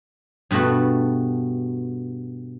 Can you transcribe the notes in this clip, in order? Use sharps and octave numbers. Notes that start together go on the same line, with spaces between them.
G2 B2 A3 F#4 B5